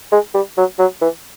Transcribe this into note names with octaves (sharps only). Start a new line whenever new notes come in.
G#3
G3
F#3
F#3
E3